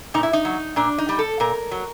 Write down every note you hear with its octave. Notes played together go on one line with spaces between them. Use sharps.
A#2 D#4
E4
D#4
F#3
A#2 D4
D#4
G3
A4
A#2 A#4
F#3